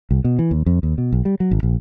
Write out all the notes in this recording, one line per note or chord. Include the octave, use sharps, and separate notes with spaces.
C2
B2
E3
D#2
F2
D#2
B2
B1
G3
F#3
G#1
A#1